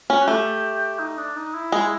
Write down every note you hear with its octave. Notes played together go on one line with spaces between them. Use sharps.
C#4
F#4
A3 G4
D#4
D4
D#4
E4
G#3